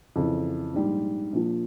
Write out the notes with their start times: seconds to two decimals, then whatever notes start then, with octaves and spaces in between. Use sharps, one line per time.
0.16 F2 C#3 E3
0.74 A#1 G#2 G3
1.33 A#1 A#2 F3